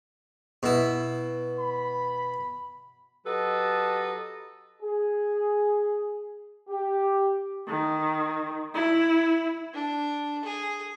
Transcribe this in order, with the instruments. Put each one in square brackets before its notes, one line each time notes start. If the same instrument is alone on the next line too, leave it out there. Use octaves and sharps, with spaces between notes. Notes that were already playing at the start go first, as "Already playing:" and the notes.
[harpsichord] B2 E4
[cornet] B5
[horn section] F#3 G4 A4 B4 D#5 A5
[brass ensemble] G#4
G4
[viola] D#3
E4
[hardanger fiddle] D4
G#4